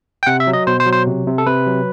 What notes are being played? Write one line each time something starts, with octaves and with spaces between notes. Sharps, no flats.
G5
C3 F#5
E5
F#3
D#5
B2 C5
C5
F#3
C5
C3
C3
A4
C3 B4
F#3